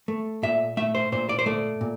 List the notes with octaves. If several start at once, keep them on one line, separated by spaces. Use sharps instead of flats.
A3
A#2 E5
A3 E5
C5
A#2 C5
D5
C5
A3 D5
A#2